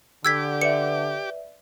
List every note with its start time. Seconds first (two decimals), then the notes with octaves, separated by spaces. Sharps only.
0.25 D3 G4 D6 E6 G#6 B6
0.62 B4 D5 E5 C#7